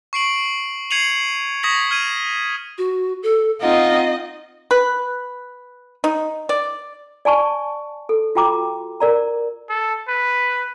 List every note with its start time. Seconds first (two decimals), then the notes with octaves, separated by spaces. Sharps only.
0.13 C#6 C7 D7 F#7
0.91 G#6 C7 C#7 D#7 F7 F#7
1.63 C#6 D#6 G#6 A#6 B6 F#7
1.91 F6 G#6 D#7
2.78 F#4
3.23 A4
3.61 C4 D#4 F4 D#5 F#5
4.71 B4
6.04 D#4
6.49 D5
7.25 D5 G#5 A5 C#6
8.09 A4
8.35 F4 F#4 G5 A#5 D6
9.00 A#4 D5 A#5
9.70 A4
10.08 B4